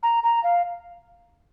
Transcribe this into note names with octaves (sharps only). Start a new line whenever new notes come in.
A#5
A#5
F5